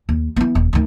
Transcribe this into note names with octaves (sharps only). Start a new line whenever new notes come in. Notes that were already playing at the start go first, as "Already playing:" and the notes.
D#2
E3 B3
D#1
D2 D#3